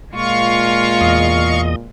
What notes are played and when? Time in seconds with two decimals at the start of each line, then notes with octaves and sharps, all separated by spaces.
0.14 A#2 G#3 F4 F5 C#6
1.01 E2 D#5